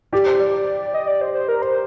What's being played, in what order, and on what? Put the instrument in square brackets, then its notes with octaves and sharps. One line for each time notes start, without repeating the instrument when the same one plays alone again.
[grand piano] G4 [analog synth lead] D5
[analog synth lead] C5
D5
D#5
D5
C5
C5
A#4
C5